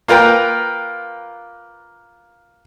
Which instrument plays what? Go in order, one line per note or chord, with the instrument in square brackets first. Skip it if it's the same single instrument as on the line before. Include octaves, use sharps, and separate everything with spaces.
[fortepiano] A#3 F4 A#4 B4 G5